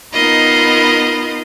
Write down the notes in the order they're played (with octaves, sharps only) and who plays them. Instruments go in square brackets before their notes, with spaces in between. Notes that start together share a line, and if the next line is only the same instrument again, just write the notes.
[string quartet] B3 D#4 F4 A#4 D#5 B5